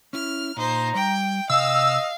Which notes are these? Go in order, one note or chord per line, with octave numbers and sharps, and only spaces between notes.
C#4 E4 F6
A#2 D#4 C5 A#5
G3 G5
C3 D#5 F5 G5 E6